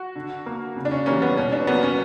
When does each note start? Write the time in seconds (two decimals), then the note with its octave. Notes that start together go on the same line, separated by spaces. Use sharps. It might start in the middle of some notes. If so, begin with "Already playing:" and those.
Already playing: F#4
0.16 D3
0.46 A#3
0.77 C#3
0.85 D4
0.91 C#4
1.06 E3 G3 A#3 C#4
1.22 B3
1.37 B2 C#4
1.52 D4
1.67 F#3 A#3 B3
1.83 C#4